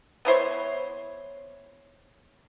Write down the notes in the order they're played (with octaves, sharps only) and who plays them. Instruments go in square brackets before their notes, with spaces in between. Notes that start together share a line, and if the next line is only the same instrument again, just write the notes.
[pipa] B3 E4 C5 C#5